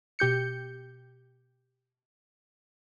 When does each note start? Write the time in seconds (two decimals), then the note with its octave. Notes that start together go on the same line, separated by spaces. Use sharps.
0.19 B2 G4 G6 C#7